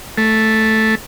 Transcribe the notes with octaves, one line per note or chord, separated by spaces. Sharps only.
A3